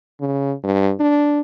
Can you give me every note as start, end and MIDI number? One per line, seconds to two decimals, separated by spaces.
0.20 0.53 49
0.64 0.92 43
1.00 1.41 62